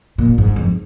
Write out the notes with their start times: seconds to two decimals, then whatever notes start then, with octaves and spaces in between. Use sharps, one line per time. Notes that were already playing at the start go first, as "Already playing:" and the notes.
0.18 A#2
0.38 G#2
0.56 F2